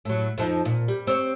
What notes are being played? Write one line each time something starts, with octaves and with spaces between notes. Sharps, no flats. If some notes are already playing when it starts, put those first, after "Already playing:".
A2 F#3
F2 F3 D#4
A#2
G3
C4 C#5